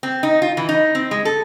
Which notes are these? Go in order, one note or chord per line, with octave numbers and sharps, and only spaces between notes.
C4
D#4
F4
E3
D#4
C4
G#3
A4